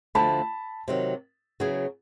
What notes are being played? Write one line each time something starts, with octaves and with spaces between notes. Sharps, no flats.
D2 D3 F3 A3 A5 B5
C3 D#3 F#3
C#3 F#3 B3 E4 G#4